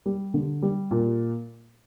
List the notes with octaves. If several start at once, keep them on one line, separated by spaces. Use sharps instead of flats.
G3
D3
G3
A#2